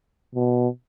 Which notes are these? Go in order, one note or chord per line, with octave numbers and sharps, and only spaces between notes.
B2